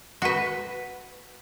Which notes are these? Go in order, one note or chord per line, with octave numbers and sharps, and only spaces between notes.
F#4 B4